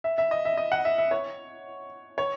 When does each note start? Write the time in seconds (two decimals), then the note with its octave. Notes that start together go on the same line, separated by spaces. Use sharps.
0.04 E5
0.18 E5
0.31 D#5
0.45 E5
0.57 D#5
0.72 F#5
0.85 E5
0.98 E5
1.11 C#5
2.18 C#5